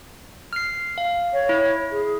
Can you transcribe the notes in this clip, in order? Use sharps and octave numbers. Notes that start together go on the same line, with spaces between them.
F6 C7
F5
C#5
E4
G#4